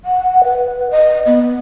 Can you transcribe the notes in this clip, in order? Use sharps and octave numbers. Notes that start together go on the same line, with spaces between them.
F#5
B4
D#5
B3